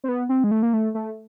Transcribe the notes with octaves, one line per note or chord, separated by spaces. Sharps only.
C4
B3
C4
G#3
A3
A#3
A3
A3